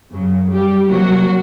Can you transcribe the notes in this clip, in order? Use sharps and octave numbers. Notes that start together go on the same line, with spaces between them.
F#2 C#3 F#3
G3 G4
C3 F3 F#3 A#3 F#4